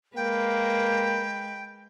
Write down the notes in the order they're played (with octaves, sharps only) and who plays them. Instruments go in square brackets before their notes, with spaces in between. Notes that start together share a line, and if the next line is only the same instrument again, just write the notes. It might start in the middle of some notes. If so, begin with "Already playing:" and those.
[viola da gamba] G#3 B4 [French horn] A#3 [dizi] G5